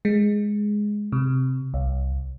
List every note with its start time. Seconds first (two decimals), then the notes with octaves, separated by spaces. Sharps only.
0.05 G#3
1.12 C3
1.74 C2